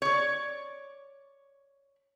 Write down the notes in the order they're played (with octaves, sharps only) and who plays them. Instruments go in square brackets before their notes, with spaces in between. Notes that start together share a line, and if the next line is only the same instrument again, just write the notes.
[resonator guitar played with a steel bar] C#5 D5